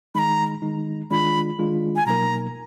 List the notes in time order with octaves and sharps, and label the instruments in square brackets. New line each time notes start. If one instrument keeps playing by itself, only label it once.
[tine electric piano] D#3 G#3 D#4 [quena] A#5 B5
[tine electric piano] D#3 G#3 D#4
[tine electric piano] D#3 G#3 D4 F4 [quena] B5
[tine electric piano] D#3 G#3 D4 F4
[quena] G#5
[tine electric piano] B2 F#3 A#3 D#4 A#4 [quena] A#5